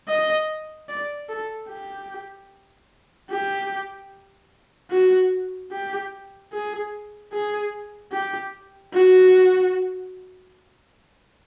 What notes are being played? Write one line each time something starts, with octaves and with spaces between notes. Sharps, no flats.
D#5
D5
A4
G4
G4
F#4
G4
G#4
G#4
G4
F#4